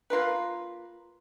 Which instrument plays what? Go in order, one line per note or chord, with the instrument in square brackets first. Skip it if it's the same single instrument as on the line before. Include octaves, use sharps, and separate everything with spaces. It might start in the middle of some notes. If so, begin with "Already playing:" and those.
[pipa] A#3 F4 A#4 B4